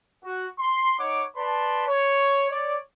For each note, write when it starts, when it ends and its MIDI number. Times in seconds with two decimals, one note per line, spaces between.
0.24 0.47 66
0.59 0.94 84
0.98 1.22 63
0.98 1.22 73
0.98 1.22 78
0.98 1.22 86
1.36 1.85 71
1.36 1.85 74
1.36 1.85 81
1.36 1.85 83
1.36 1.85 84
1.87 2.50 73
2.50 2.77 73
2.50 2.77 74